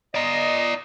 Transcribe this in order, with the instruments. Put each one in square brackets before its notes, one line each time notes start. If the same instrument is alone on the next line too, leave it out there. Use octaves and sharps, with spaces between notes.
[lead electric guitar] D5 A#5 [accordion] D#5